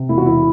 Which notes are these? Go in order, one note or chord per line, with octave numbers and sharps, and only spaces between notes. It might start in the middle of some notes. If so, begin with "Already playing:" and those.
Already playing: C3
E1 E4
F#4
E2 E4